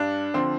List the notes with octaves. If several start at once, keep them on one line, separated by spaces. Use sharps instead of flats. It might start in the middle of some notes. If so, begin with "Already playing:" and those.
Already playing: G2 D4
D3 F3 C4